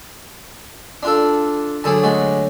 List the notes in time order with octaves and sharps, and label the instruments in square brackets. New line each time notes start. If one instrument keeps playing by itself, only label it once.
[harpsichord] D4 F4 A4
[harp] D3 F#3 D4 [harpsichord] G#4 A4 A5
[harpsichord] G#3 F#4 [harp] A3